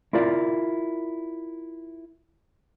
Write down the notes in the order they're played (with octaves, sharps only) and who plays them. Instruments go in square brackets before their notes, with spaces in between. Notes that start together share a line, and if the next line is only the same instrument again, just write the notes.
[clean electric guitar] E4 F4 A#4 D5 F5